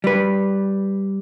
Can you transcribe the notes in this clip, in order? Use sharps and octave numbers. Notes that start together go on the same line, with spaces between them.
G3 B4